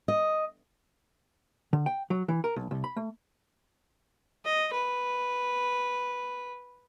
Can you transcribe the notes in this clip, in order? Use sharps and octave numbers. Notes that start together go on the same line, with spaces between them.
D#5
D3
G5
F#3
E3
A#4
B1
C2
B5
A3
D#5
B4